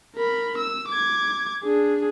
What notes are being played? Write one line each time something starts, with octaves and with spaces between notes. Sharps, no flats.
A#4 B5
E6
D6 G#6
D4 G#4